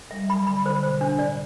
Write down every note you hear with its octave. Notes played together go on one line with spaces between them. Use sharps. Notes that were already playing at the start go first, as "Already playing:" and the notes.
G3 E5
F#3 B5
D3 B5
D3 C5
B2 C5
A2 D4
D5